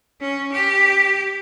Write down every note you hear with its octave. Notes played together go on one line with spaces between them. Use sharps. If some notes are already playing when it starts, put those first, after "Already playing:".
C#4
G4